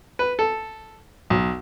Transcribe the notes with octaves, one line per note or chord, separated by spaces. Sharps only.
B4
A4
B1